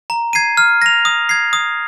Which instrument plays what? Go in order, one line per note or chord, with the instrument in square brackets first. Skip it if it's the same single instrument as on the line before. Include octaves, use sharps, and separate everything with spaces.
[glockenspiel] A#5
G#6 C7 D#7
F6
A#6 F7
D#6
G#6 C7
D#6